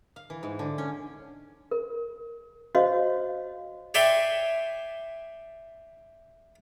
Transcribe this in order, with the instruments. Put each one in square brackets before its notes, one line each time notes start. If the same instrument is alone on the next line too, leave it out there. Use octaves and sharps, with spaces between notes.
[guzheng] F5
E3
G#2
D3
C#4
[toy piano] A#4
F#4 C5 C#5 D#5 F5
[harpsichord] C#5 D5 E5 G5 G#5 C6